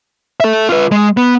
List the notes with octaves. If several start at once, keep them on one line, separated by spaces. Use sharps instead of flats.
A4 E5
F4 B4
G#3
B3